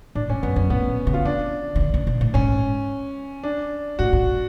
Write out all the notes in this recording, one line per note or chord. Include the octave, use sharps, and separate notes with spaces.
A2 D4
G#2 C#4
F#2 B3
F#2 C#4
A2 B3
B2
C#3
F4
C#3 D4
C#3
D3
C#3
B2
A2
G#2 C#4
D4
A2 F#4
G#2